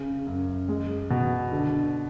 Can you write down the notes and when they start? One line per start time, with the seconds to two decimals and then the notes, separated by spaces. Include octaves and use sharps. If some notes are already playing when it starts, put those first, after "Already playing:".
Already playing: C#3
0.27 F#2
0.69 G#3
1.10 B2
1.52 D3